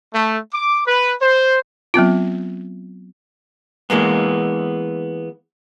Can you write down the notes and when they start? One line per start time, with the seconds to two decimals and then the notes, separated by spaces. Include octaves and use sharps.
0.14 A3
0.52 D6
0.86 B4
1.21 C5
1.94 F#3 B3 C4 F4
3.90 E3 G#3 A#3 B3